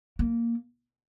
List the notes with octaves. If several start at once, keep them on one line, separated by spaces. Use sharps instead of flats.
A#3